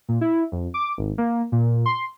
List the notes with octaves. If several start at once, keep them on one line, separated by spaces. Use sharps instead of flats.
A#2
E4
F2
D6
G#1
A#3
A#2
C6